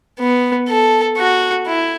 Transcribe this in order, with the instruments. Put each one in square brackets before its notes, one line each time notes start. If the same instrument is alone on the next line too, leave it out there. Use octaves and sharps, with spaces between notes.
[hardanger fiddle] B3
A4
F#4
E4